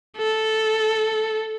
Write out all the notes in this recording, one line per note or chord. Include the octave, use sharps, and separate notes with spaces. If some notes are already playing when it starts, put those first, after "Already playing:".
A4